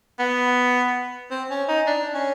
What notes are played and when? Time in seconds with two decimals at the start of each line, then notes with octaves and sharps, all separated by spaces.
0.19 B3
1.31 C4
1.50 C#4
1.68 D#4
1.87 D4
2.14 C#4